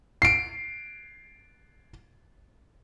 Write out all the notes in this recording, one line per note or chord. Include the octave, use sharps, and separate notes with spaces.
C7 D7